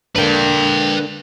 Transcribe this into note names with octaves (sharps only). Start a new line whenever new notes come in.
D3 A#3 D4 B4 G5